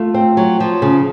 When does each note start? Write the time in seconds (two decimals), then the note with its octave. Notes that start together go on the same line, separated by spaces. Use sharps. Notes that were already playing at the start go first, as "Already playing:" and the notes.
Already playing: A3 F4
0.14 C4
0.37 F#3
0.60 F3
0.82 C#3